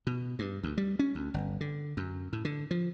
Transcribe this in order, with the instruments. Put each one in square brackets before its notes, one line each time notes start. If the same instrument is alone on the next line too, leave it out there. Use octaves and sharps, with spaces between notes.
[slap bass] B2
G2
D2
G3
C#4
D2
G1
D3
F#2
A2
D3
F3